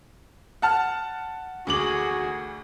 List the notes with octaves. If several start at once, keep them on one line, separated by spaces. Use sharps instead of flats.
F#5 A5 F6
D2 F#4 G#4 D6 F#7